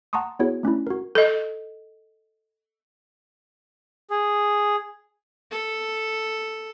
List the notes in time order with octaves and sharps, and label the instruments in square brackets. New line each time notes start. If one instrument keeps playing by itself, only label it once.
[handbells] F#5 A5 A#5 C6 C#6 D#6
B3 E4 F#4 G#4 C#5
A3 C#4 D4 E4
F#4 A#4
[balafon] A4 D#5
[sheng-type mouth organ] G#4
[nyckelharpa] A4